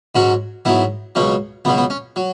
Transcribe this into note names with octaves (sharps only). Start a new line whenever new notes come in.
G#2 F#3 C#4 F#4
G#2 F#3 B3 E4
C#2 B2 F#3 C#4
C#2 B2 F#3 B3
B3
C#4
F#3